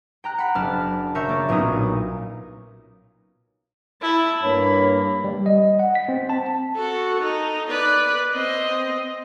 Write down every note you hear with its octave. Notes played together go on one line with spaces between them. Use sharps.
G5 A#5 F#6
F#5 B5
F#1 D4 A5 B5 F6
C#3 A#4 E5 C#6 G6 C#7
A#3 D5
B1 A#2 C#4 D#4 D#6
E4 A5
G2 A#3 C#5 B5
G3
D#5
F#5
B6
C4
A5
F#4 A4
D#4
B4 D5
C4 D#5